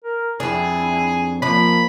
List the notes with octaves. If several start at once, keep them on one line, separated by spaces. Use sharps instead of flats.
A#4
F2 D4 E4 G#4
F3 A#3 D5 B5